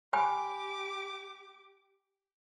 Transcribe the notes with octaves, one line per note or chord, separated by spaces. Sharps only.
G4 G5 G#5 B5 D6